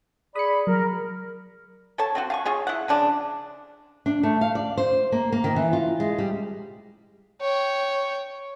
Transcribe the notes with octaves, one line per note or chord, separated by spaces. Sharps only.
G#4 D5 B5 D#6 C#7
F#3 A#4
A4 C#5 A5
C4 F4 F#4
F5 G#5 C#6
F4 G#4 C#5
E4 F#5
C#3 F3 D4
D4
A3
F5
D5
C5
A#3
A#3
D#3
E3
F4
G#3
G3
C#5 G5